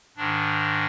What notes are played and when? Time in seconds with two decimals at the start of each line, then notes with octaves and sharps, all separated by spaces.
0.17 G#2 D#3 D4